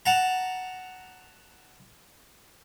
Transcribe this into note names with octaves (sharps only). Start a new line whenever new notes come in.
F#5 A5 A#5